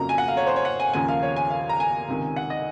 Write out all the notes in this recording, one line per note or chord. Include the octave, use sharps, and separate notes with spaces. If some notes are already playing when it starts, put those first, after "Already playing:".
Already playing: F2 C#3 F#3 A#3 A#5
G#5
F#5
F5
C#5
C5
C#5
F#5
G#5
D#2 C#3 F3 A#3 G#5
F5
C#5
G#5
F5
A#5
G#5
C#2 C3 D#3
F#5
D#5